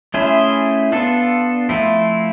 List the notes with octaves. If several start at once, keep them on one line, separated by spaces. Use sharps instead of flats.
A3 C#4 E4 G#4 C5
B3 D4 F4 A4
F3 A3 C4 E4